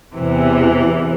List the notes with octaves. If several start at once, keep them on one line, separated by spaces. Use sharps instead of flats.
E2 C3 E3